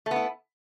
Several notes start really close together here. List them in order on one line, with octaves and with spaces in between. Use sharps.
A3 B3 E4